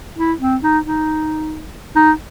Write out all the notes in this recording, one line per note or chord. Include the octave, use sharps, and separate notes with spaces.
E4
C4
D#4
D#4
D#4